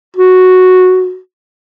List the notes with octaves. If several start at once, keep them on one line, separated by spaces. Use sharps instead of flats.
F#4